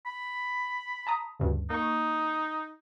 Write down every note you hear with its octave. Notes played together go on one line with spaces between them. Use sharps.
B5
A5 A#5 D#6
D2 G2 C#3
A#3 D#4 C#6